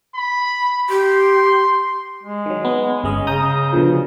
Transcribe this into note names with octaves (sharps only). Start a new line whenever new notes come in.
B5
G4 C6
G#3
D#3 F#3
B3
G1 G#3 C#4 D#5
C#3 A#5 D#6 G6
B2 D3 F3